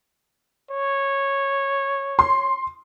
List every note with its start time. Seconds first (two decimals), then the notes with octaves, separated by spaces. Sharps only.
0.71 C#5
2.19 C6